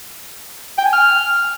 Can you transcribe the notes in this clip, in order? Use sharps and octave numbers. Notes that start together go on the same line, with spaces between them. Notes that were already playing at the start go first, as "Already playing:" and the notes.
G5
G#5
F6